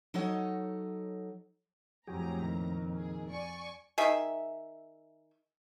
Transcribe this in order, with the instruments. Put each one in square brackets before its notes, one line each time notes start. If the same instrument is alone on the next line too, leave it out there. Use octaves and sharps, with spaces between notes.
[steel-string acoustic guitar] F#3 D#4 A4 C#5 D#5 F#5
[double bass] F2 [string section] A2 A#5 [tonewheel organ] F#3 G4 G#4
[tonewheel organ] A#2 D#3
[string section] G#4
D5 G#5 C#6
[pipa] D#3 G#4 E5